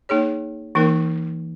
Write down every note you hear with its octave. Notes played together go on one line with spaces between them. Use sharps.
A#3 D#4 G#4 C#5
E3 A#3 D#4 A#4